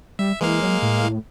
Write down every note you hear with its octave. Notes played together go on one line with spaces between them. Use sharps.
G3 E5
E3 G#3 A#3 F5
F#3
A2